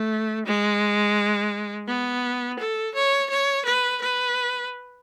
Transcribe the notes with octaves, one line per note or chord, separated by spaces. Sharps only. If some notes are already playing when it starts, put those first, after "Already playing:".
Already playing: A3
G#3
B3
A4
C#5
C#5
B4
B4